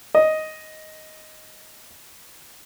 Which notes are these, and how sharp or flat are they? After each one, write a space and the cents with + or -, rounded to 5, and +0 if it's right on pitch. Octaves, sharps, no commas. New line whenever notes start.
D#5 +5